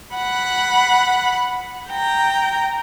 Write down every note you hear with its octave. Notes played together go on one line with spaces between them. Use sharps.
F#5 B5
G5 A#5